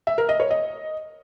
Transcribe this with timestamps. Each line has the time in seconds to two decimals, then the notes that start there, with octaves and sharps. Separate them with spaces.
0.07 E5
0.18 A#4
0.29 D#5
0.40 C#5
0.51 D#5